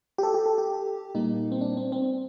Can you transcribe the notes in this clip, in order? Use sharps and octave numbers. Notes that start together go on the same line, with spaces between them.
G4
A4
G4
A4
G4
A#2 G3 A#3 D#4
C4
D4
C4
C4